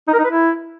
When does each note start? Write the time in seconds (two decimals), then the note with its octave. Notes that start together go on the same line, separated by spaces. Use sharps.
0.08 D#4
0.13 A#4
0.19 D#4
0.24 B4
0.30 E4